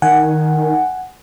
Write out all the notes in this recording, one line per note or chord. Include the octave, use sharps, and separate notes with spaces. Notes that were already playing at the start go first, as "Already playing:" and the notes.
D#3 F#5 G#5